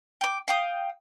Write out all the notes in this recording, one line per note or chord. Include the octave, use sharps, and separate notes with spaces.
G5 D6
F5 G5 D#6